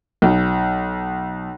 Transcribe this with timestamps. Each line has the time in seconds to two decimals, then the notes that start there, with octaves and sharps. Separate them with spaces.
0.22 B1